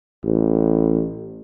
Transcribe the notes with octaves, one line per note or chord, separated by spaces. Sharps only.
A1